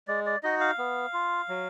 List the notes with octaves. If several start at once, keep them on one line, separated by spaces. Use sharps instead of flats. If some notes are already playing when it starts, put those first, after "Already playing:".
G#3 D5
D5
D#4 F#4 D#5
F5
B3
F4
F#3